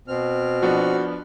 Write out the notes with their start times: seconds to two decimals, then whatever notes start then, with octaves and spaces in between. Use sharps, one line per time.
0.08 B2 C4 F6
0.62 F3 B3 D4 F#4